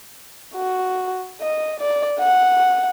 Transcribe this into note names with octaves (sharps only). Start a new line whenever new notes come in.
F#4
D#5
D5
F#5